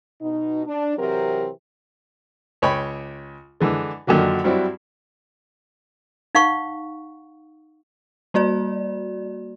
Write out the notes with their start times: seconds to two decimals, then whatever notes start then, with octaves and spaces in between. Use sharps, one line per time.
0.21 B2 D#4
0.66 D4
0.97 C3 E3 F#3 C4 G4 A#4
2.62 C#2 C#5 G5 B5
3.60 D3 E3 G#3
4.07 F#2 A#2 D3 D#3 F#3
4.44 G2 F#3 C4 D4 E4 F#4
6.35 D#4 F5 F#5 C#6
8.34 G3 A#3 F#4 D5